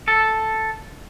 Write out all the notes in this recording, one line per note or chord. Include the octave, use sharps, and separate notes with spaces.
A4